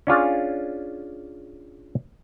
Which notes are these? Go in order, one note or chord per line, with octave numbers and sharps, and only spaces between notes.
C#4 D4 F4 G#4